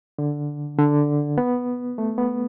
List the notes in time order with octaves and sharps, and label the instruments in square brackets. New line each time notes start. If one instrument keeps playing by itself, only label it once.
[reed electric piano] D3
D3
B3
A3
B3